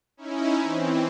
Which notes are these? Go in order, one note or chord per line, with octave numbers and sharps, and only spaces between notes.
C#4 D#4 E4
E3 C4